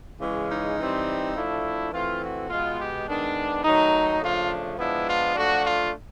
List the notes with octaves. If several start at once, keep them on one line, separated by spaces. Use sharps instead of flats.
C#3 E3 G#3 C#4
D#4
E3 G3 C4
F3 A3 D4 E4
E3 A3 C4 F4
F#4
B2 G#3 B3 F4
G4
D#3 G#3 B3 D4
D#3 F#3 A3 D#4
C#3 F3 A3 D4 F4
F3 G#3 B3 D4 E4
F4
F3 A3 D4 F#4
F4